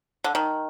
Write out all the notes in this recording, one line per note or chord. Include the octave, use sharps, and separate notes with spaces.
D3
D#3